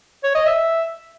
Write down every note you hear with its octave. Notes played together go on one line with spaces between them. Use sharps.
C#5
D#5
E5